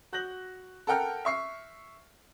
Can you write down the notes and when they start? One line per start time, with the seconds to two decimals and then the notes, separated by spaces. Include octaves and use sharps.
0.12 F#4 F#6 G6 A#6 F#7
0.87 A4 A#4 F#5 G5 F6
1.25 E5 C#6 C7